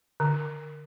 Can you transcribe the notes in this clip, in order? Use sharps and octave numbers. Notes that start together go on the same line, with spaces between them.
D3